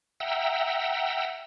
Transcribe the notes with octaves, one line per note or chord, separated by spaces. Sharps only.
E5 F#5 G5 A#5 E6